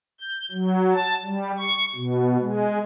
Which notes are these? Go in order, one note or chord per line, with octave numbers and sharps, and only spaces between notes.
G6
F#3
A5
G3
C#6
B2
G#3